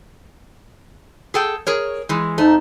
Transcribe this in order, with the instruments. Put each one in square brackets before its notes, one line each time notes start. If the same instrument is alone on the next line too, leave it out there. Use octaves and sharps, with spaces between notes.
[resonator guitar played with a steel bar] G#4 A4 G5
G#4 A#4 C#5
E3 G#3
[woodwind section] F2 D#4 [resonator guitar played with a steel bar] A3